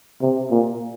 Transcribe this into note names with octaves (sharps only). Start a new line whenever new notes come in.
C3
A#2